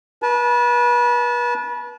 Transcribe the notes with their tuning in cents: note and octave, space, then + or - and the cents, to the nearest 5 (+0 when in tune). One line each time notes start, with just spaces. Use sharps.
B4 -35 A5 -30